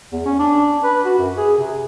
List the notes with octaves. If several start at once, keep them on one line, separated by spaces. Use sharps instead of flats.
E2
C#4
D4
B4
F#4
F#2
G#4
C3